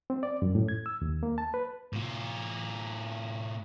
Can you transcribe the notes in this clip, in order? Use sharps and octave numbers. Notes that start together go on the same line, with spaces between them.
C4
D5
F#2
A2
G#6
E6
D#2
A#3
A5
B4
A2 F4